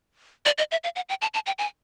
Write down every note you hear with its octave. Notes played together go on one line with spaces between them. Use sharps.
D5
D#5
E5
F5
F#5
G5
A5
A5
G5
G#5